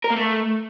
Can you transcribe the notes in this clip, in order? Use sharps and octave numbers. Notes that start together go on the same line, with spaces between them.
A#4
A#3
A3